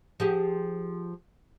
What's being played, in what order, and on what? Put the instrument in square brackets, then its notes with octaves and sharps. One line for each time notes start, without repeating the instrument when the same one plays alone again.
[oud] F3 G4 G#4